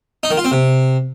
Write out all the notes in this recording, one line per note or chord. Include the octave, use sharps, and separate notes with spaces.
D#4
D#3
F4
C4
C3